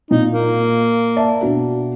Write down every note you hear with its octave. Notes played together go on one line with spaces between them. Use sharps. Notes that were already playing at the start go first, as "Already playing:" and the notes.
A#2 D#4
A#3
D5 E5 A5
B2 D4 F#4